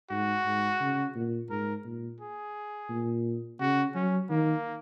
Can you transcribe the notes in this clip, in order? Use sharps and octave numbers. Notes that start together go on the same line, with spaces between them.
G#2 F#4
G#2
C#3
A#2
G#2 A#4
A#2
G#4
A#2
C#3 F#4
F#3 C#4
D#3 A#3